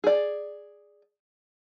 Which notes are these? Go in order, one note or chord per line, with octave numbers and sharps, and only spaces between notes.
G#4 D5